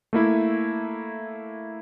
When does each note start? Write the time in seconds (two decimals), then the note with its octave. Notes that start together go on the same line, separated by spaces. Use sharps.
0.13 A3 A#3 E4